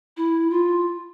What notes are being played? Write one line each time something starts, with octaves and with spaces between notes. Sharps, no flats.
E4
F4